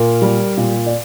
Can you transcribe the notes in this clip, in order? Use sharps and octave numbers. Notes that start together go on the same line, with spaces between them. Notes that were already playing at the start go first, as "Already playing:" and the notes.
Already playing: A#2 A#4
G3
A#2
D5